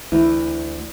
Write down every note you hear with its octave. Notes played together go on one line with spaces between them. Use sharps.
D2 E3 E4